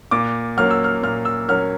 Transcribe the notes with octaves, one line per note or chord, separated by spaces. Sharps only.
A#2 D6
F#3 A#3 C#4 F6
E6
F6
A#2 F6
E6
F#3 A#3 C#4 F6